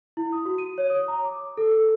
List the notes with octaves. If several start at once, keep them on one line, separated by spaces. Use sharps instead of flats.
E4
D#6
F#4
D#7
C#5
D#6
A#5
D6
A4
A4